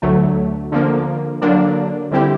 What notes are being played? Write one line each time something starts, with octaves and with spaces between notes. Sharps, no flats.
D2 D3 F#3 A3
D3 F3 A#3
D3 F#3 A#3 D4
D3 G3 C4 E4 G4